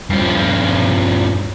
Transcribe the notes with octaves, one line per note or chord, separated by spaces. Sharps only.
G2 F3